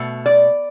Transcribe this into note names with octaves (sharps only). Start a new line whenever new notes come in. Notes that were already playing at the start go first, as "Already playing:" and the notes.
Already playing: B2 A3
D5